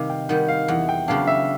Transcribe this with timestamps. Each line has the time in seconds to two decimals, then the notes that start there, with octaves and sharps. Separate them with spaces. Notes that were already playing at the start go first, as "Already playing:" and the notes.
Already playing: C3 D#3 G3 F5
0.10 G5
0.29 D#3 G3 F#5
0.48 F5
0.68 E2 F#5
0.89 G5
1.08 C#3 F#3 B3 D4 F5
1.27 E5